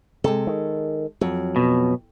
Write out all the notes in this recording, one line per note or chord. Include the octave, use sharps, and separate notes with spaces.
C3 G#3 A4
D#3
F2 F#3
B2